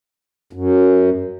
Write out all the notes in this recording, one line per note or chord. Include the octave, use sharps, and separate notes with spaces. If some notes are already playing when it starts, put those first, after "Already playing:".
F#2